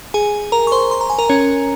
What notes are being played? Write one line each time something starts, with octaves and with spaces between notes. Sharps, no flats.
G#4 G#5
A#4 A#5
C#6
C5 C6
C6
A#5
G#5
A#4 A#5
C#4 C#5